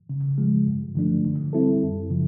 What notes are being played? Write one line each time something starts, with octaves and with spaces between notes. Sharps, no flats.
C#3
F3 G#3
G2
D3 F3 A3 D4
D3
G3 C4 E4 A4
F#2
C#3 F3